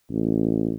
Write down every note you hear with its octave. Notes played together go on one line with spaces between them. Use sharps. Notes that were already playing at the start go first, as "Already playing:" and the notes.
A1